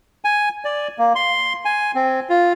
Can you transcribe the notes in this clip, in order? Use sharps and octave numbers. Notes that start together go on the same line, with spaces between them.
G#5
D5
A#3
C6
G#5
C4
F4